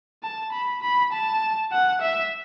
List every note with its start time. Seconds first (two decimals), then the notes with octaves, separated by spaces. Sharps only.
0.23 A5
0.53 B5
0.82 B5
1.13 A5
1.72 F#5
2.02 E5